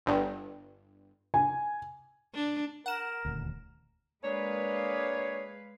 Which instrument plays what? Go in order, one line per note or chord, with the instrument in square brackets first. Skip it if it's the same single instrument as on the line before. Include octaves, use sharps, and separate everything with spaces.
[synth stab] G1 G2
[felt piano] G#5
[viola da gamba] D4
[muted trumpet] A#4 [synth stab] F#5 E7
[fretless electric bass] D#1 D2
[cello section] G#3 B4 F5 [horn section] A#3 D4 G#4 [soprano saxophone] C#5